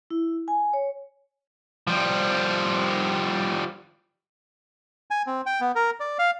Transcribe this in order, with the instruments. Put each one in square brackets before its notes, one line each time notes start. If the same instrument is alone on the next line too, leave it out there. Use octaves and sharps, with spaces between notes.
[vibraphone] E4
G#5
C#5
[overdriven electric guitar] F3 G3
[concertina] G#5
C4
G5
B3
A#4
D5
F5